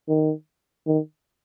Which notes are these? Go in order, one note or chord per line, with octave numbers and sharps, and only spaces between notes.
D#3
D#3